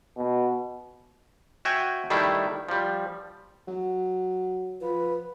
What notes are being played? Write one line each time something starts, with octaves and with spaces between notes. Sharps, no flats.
B2
F#4 C#5 E5 G5 G#5
D#3 G3 A3 D4 E4
F3 G3
F#3
F3 B4